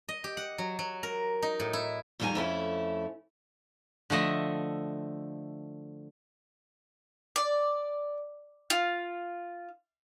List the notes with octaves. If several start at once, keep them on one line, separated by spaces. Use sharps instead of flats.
D#5
G4
F#5
F#3
F#3
A#4
D#4
A2
E4
F2 D#3 G3 F4 G#5 A#5
F2 A3 C#4 E4
D3 F3 A3 D#5 E5
D5
F4